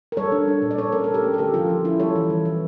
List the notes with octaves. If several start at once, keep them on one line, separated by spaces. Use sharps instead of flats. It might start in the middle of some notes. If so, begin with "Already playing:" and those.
A#4
G3 A4 C#5
D4
D4
A#2
D5
C#4 A4 C#5
A3 A#4
C#4 A4
G4 A#4
A3
A4
D3 G4 A#4
F3 F4 A4
C#4
E4
G3 A4 C#5
E3
E3
E3